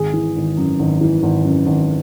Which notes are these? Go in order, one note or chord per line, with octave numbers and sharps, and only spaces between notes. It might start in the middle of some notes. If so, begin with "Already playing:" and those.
Already playing: G#1 G#4
E3
G#1
F#2
G#1
E3
G#1
F#2
G#1